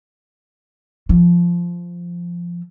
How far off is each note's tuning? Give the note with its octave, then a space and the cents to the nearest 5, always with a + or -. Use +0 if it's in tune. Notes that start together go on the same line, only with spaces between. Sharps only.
F3 -5